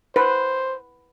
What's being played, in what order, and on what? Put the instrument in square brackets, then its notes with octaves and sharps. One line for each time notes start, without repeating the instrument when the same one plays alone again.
[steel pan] B4 [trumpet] C5